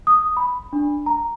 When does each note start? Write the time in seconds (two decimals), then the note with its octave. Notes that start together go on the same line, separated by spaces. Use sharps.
0.07 D#6
0.37 B5
0.73 D4
1.06 A#5